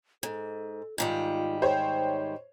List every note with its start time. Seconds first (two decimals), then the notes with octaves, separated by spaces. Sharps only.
0.23 G#2 A4
0.98 G#2 D#3 G3 F4
1.62 C5 C#5 G5